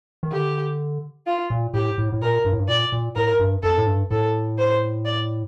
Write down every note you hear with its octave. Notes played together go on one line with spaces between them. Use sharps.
D#3
D3 G4
F4
A#2
A2 G4
A2
A2
A#2 A#4
G2
A2
G2
A#2 D5
A#2
A2 A#4
G2
F2 A4
A2
G2
A2 A4
C5
D5